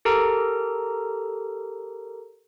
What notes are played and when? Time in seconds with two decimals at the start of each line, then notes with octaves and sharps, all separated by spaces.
0.05 G4 A4 A#4 A#5